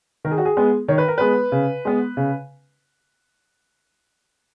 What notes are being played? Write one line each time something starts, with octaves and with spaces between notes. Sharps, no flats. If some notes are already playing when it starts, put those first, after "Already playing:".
D#3 A#4
G#4
F#4
G#4
G#3 B3
D#3 C#5
B4
A#4
G#3 B3 B4
C#3
G#3 B3
C#3